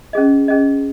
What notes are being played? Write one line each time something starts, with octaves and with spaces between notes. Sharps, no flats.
C#4 G#4 D#5
C#4 G#4 D#5